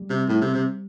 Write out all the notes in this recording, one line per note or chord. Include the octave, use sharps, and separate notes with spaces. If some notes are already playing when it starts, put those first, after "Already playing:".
Already playing: G3
C3
A2
C3
C3